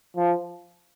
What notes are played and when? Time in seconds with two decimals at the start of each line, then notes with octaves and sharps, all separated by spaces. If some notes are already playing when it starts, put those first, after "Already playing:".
0.17 F3